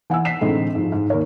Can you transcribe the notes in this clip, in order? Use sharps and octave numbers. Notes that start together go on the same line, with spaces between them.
E3 F#5 G#5 E6
B6 C7 E7
A2 D3 E3 G#3 C4 D#4
G#2 F3
G#2
D#2 A#4 C#5